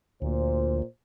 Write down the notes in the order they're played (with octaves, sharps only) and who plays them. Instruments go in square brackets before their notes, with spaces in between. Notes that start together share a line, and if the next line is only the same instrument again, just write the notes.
[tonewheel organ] D2 [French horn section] A#2 C5